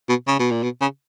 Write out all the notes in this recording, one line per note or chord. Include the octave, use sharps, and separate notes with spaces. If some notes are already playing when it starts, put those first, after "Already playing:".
B2
C#3
B2
A#2
B2
C#3